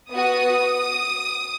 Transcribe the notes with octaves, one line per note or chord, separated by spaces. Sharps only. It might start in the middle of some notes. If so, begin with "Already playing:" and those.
B3 F#4 D#6